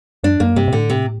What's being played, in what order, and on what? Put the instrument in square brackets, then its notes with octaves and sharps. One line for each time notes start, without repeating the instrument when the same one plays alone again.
[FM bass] F#2 [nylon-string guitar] D4
[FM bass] F#2 [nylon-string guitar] A#3
[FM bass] G2 [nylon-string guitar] C3
[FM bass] A#2
[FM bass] A2 [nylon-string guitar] D3
[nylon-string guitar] C3